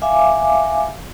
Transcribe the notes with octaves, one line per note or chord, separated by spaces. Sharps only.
E5 F5 G#5 D6